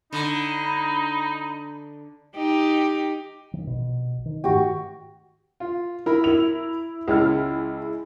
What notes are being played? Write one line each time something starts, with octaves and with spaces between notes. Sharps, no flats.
D3 D#4 A#5 B5
D#4 G4
D#3 E3
A#1 B2
D#3
G#2 D#3 A3 F#4 G4
F4
E4 A#4 B5
E4 F7
C#2 G#3 E4 F6